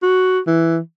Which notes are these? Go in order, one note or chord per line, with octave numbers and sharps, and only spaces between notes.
F#4
E3